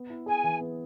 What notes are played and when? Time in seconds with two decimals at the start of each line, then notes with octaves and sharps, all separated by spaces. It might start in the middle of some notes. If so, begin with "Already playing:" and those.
Already playing: B3
0.10 E4
0.26 G#4 G#5
0.44 E3
0.60 B3